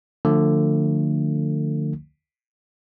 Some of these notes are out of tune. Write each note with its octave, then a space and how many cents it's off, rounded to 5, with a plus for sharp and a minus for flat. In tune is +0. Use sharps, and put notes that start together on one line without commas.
D3 +30 F3 +25 A3 +35